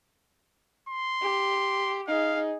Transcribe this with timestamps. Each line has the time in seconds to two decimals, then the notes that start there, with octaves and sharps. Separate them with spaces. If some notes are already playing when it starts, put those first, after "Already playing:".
0.89 C6
1.22 G4
2.08 D#4 G#4 F5